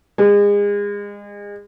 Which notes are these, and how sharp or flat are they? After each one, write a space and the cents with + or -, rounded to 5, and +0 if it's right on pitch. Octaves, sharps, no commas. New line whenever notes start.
G#3 -30